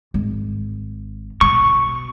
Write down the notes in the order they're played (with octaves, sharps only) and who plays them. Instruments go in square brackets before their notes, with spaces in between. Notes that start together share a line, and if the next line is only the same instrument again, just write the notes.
[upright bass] G#1
[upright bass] B2 [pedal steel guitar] C#6